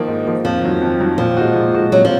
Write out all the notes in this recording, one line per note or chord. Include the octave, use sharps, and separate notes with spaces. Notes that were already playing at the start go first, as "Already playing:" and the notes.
Already playing: D#3 F3 A#3
G#2
F3 A#3
F2 F3
D#3 F#3
F2
D#3 F#3
A#2 F3
G#3 D#4 F#4
A#2
G#3 D#4 F#4
C3 F#3
F3